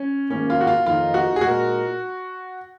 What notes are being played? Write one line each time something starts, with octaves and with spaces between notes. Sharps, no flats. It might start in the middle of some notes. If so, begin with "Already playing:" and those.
Already playing: C#4
G#1 G#2 D#3 A#3 C#4
F4
F#4
F4
F2 D#3 A#3 D#4 F4
F#4
G#4
A#2 G#3 D#4 F#4 A#4